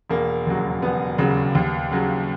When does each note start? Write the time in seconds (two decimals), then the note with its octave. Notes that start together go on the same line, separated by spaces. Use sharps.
0.10 E1 A#3
0.47 D#2 C#3 F#3
0.82 E1 B3
1.18 D#2 C#3 F#3
1.55 D#2
1.91 C#3 F#3